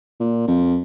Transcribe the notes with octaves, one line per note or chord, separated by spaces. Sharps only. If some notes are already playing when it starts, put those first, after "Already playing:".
A#2
F2